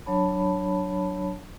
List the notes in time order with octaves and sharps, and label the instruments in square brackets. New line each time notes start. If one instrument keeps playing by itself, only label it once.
[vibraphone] F#3 D4 C#5 A5 B5